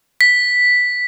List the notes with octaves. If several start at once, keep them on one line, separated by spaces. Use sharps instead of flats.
B6